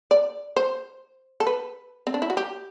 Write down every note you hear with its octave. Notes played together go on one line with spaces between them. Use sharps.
D5
C5
A4
B4
C4
D4
E4
F#4
G4